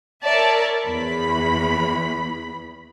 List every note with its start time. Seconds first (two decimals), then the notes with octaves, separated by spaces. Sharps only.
0.23 A#4 C#5 D5 E5 A5
0.85 E2 B5